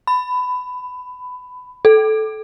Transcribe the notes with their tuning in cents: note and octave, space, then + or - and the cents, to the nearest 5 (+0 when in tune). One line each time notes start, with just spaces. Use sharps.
B5 +20
A4 -15